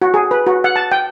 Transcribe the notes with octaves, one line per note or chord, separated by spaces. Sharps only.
F#4
G#4
B4
F#4
F#5
A5
G5